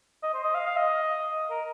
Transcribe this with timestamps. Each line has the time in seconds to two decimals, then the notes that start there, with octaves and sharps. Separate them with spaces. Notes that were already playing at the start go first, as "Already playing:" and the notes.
0.23 D#5
0.34 C5
0.44 D#5
0.55 F5
0.66 F5
0.76 D#5
1.50 A#4